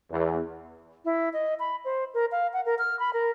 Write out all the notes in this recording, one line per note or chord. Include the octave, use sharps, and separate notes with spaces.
E2
E4
D#5
B5
C5
A#4
F5
F#5
A#4
F6
B5
A#4